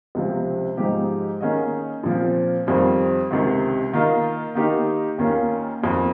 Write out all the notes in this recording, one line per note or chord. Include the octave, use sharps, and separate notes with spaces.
C#2 C3 F3 C4
G#2 F3 G#3 D#4 G4
D#3 A#3 C#4 G#4 D#5
A#2 F3 C4 F4
F2 D#3 G3 C4 F4
C#2 C3 D#3
D#3 A#3 F4 A#4 D#5
D#3 A#3 D#4 G4 A#4
D#2 D#3 A#3 C#4 F4
F2 D#3 A#3